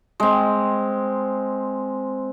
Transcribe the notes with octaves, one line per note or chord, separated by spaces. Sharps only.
G#3 C4